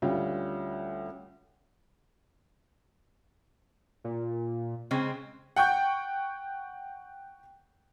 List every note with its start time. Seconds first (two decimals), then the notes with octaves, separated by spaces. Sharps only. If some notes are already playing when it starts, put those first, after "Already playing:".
0.02 D2 G3 C#4 F4 G5
4.04 A#2
4.91 C#3 G#3 C4
5.56 F#5 G5 C#6 G6